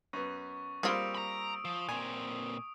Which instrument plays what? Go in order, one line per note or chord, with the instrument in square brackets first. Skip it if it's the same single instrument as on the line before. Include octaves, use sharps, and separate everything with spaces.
[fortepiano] F#2 B3 [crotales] C#6
[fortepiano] G3 A#3 C4 [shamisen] F4 G#4 [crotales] D#6 E6 D7
[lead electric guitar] A#5 B5
[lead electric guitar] F3 [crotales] D#6
[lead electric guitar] A#2 C4 [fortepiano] G#5